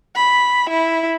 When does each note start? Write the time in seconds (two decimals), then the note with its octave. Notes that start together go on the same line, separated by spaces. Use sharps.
0.16 B5
0.70 E4